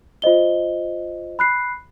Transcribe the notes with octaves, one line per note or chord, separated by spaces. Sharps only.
F4 C5 D#5 G7
B5 F#6 C7